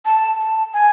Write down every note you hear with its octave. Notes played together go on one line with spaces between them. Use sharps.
A5
A5
G#5